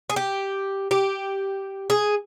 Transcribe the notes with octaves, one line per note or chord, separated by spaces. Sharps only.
G#4
G4
G4
G#4